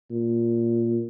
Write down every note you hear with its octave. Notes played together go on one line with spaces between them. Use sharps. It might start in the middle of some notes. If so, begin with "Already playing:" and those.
A#2